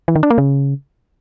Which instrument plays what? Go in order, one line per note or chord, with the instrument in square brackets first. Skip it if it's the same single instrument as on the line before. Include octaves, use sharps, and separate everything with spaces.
[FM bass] E3
D#3
D4
A#3
C#3